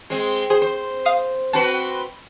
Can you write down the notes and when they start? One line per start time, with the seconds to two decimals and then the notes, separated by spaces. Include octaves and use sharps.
0.10 G#3 C4
0.50 G#4 C5
0.62 C5
1.05 F5 D#6 C7
1.53 C4 F#4 B4 A5